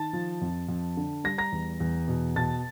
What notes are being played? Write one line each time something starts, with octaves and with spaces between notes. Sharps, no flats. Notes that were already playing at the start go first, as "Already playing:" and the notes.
Already playing: D#3 A5 A6
F3
F2
F2
D3
G3 A#6
A#5 A#6
E2
E2
B2
B2 A5 A6